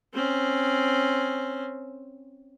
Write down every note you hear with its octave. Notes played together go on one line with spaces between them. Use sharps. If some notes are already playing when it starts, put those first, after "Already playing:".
C4 C#4